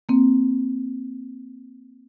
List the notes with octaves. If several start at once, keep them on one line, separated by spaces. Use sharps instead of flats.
A#3 C4